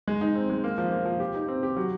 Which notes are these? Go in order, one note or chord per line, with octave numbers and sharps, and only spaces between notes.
G#3
D#4
C4
G#3
A#3
F3
A#3
F3
G4
D#4
C4
G4
F#3